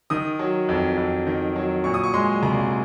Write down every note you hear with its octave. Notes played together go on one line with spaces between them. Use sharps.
D#3 D#6
F#3
F2
F2
D#3
F#3
A#2 C#6
D#6
C#6
G#3 C6
C2 A#5